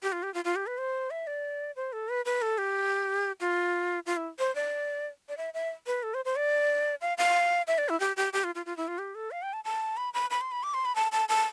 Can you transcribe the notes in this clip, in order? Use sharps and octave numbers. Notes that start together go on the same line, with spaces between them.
G4
F4
G4
F4
F4
G4
B4
C5
E5
D5
C5
A4
B4
B4
A4
G4
F4
F4
E4
C5
D5
D5
E5
E5
B4
A4
C5
C5
D5
F5
F5
E5
D5
E4
G4
G4
G4
F4
F4
F4
E4
F4
G4
A4
F5
G5
A5
A5
B5
B5
B5
C6
B5
D6
C6
B5
A5
A5
A5